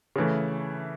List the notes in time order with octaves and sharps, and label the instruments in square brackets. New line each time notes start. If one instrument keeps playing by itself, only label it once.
[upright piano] C#3 E3 A3